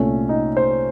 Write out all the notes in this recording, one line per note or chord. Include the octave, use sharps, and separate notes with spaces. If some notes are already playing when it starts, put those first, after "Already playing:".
Already playing: C2 A#2 A3 C#4
D#4
C5